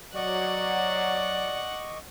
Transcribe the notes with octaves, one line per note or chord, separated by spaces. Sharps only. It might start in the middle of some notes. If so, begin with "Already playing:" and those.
F#3 D5 D#5 F#5 C#6 D6